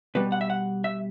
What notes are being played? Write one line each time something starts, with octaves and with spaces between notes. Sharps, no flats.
B2 G3 B4
F#5
E5
F#5
E5